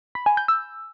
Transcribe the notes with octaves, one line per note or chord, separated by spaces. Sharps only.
B5
G#5
G6
E6